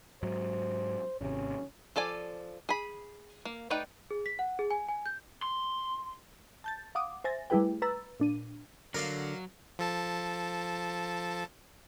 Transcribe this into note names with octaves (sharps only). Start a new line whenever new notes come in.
G#2 F#3 C5
G#1 C3 C#4
F3 A4 D5 G#5
G#4 B5
A#3
A3 D#4 B4 D5 G5
G#4
B6
F#5
G#4
G#5
G#5
G6
C6
A5 G6 A6
F5 F#5 D6 D#6
C5 E5 G#5 A6 A#6
G3 A3 E4 G#4 B4 G5
B4 A#5 E6 A6
A#2 D4 D#7
D3 F#3 A#4 D5 F5
F3 A4 A5